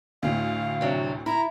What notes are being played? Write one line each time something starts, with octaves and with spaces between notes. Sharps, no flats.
D2 A2 F5
C3 F#3 D4
E4 A#5 B5